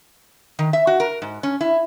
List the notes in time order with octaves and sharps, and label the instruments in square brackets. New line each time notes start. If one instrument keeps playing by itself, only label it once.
[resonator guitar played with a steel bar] D#3
E5
F#4
A#4
G#2
C#4
E4